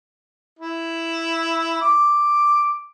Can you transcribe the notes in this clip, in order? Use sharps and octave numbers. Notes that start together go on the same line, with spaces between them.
E4
D6